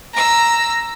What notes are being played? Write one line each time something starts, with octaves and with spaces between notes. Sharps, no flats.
A#5 E6